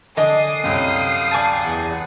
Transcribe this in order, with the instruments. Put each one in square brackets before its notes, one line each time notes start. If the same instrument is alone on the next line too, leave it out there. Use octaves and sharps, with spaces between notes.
[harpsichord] D3 [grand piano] D#5 [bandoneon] G#5 D6 [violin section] D#6 C7
[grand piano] C2 F#2 [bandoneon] F5 G5
[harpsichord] D5 G#5 A5
[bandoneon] E2 F#5